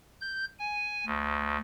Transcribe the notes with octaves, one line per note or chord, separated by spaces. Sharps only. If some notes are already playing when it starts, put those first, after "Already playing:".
G6
G#5
D2